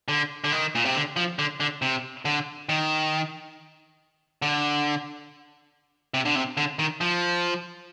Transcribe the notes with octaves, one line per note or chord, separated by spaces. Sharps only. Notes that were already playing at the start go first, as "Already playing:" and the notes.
D3
D3
D#3
A#2
C3
D3
F3
D3
D3
C3
D3
D#3
D3
C3
D3
C3
D3
D#3
F3